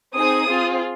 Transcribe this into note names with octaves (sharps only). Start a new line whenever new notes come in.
C4 D#4 G#4 D#6
C4 F4 G#4